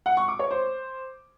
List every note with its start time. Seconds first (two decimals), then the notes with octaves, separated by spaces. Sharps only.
0.06 F#5
0.17 C#6
0.28 D6
0.39 C#5
0.51 C5